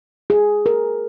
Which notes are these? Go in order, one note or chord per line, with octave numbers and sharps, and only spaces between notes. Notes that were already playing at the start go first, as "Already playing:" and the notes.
G#4
A#4